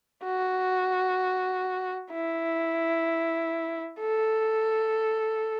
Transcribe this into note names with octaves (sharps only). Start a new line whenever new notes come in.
F#4
E4
A4